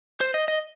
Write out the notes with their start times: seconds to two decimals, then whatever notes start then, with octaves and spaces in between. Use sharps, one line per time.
0.21 C5
0.34 D#5
0.48 D#5